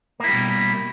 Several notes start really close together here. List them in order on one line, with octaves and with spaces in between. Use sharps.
A#3 E4 G3 B2